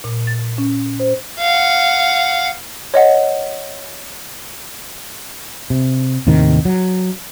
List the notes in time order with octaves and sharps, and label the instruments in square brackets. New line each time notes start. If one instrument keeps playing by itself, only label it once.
[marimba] A#2
A6
C#4
C5
[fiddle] F5 F#5
[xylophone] C#5 D#5 F#5
[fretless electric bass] C3
D#2 A2 C3 D#3
F#3